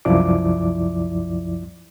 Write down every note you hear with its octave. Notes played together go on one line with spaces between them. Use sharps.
C2 F#2 F3 E4 D5 D6